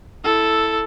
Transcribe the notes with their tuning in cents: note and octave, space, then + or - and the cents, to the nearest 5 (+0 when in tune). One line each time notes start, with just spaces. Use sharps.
E4 -5 A4 +0